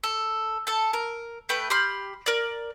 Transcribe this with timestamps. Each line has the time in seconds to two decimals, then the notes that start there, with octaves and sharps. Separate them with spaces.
0.04 A4
0.67 A4 A5
0.93 A#4
1.49 A3 B4 G5
1.70 G4 B5 C6 F6
2.26 A#4 D5